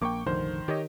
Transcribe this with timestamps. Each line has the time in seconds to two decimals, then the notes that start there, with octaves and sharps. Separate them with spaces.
0.02 A#1 A#3 G5 C#6 D6
0.26 F1 A#1 D3 D#3 C5
0.68 D#3 G4 C#5 D#5